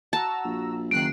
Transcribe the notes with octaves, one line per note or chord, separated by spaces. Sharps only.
F#4 A5 A#5 E6
A#1
F#1 D#3 F#6 C7 D7